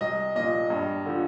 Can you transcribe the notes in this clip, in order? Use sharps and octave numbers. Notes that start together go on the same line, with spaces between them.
C2 D#5
A#2 F3 D#5
G2
D3 F3